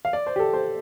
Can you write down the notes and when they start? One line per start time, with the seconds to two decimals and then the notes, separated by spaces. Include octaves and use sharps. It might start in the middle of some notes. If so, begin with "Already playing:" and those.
0.05 F5
0.13 D5
0.27 C5
0.36 G4
0.39 A4
0.54 C5